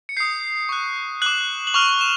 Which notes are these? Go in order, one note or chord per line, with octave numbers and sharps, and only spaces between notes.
C#7
D#6 G6 C7
C#6 F#6
D6 F#6 F#7
F#7
C#6 F6 F7
E7